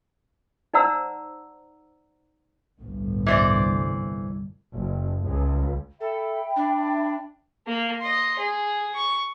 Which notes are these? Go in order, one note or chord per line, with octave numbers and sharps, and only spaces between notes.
D#4 C5 D5 F#5 A#5 E6
G1 C2 A2
E3 C5 D5
F#1
C#2
A4 E5 G5 B5
D4
A#3
D#5 C6
G#4
C#6